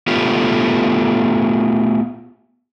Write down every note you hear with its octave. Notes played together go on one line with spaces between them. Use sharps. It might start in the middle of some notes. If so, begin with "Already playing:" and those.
A3 B3 F4 G4